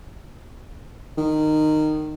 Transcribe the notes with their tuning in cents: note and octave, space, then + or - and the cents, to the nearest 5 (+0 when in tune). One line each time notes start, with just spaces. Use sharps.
D#3 -15